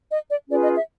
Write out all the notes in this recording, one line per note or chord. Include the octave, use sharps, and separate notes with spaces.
D#5
D5
C#4 F4 G#4 B4 D5
D#5
E5